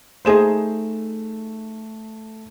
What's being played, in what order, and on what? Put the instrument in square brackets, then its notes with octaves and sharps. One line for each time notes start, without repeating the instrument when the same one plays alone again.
[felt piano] A3 E7 [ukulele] D#4 G#4 C5